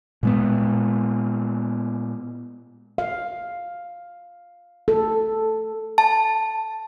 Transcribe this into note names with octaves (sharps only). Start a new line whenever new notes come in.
A#2 G#3 B3
F5
A4
A5